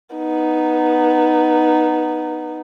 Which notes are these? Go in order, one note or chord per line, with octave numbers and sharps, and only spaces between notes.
B3 D#4